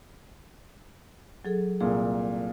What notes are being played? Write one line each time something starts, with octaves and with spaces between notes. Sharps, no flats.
F#3 G#4 A4
C2 A#2 G#4